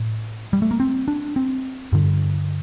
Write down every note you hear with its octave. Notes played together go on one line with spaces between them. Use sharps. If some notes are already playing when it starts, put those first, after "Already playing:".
Already playing: A2
G3
A3
A#3
C4
D4
C4
G2 D3